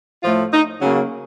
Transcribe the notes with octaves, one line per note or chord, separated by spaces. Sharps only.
A2 F3 A3 F4
D#4
C#3 F#3 A#3 C#4